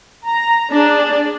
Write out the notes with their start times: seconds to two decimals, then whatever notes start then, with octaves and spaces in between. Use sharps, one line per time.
0.25 A#5
0.71 D4 G#4